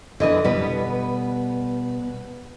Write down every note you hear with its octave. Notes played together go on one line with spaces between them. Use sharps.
D3 E3 B4 D#5
B2 G3 B3 B4